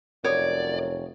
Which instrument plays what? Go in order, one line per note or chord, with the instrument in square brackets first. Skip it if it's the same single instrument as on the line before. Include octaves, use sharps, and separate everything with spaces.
[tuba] F1 [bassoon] F#2 [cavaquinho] C#5 D#6 [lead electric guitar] D5